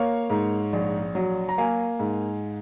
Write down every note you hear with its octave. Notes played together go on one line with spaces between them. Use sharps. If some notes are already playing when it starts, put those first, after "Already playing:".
Already playing: A#3 C#5 F5
G#2
A#1
F#3
A#5
A#3 F5 G#5
G#2